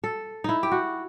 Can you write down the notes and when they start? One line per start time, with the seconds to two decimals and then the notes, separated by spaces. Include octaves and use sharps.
0.04 A4
0.44 D#4 E4
0.63 G4
0.71 F#4